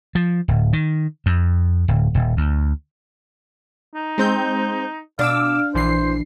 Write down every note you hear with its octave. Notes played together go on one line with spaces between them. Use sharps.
F3
D1
D#3
F2
D1
D#1
D2
D#4
G#3 C4 G6
B2 D4 F5 D6 E6
A#1 E3 C5 C7